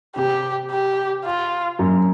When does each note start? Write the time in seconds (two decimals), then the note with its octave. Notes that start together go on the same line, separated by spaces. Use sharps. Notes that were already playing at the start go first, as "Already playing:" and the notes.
0.16 C3 G4
0.71 G4
1.25 F4
1.79 F#2